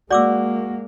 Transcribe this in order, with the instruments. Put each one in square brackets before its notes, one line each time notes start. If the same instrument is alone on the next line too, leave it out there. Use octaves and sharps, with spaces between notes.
[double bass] G#3 A#3 [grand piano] F#4 [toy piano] D5 D6 E6